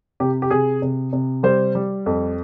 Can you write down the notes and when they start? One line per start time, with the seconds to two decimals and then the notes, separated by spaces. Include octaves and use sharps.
0.20 C3 G4
0.42 G4
0.51 C3 G#4
0.82 C3
1.13 C3
1.43 G3 C5
1.75 G3
2.06 F2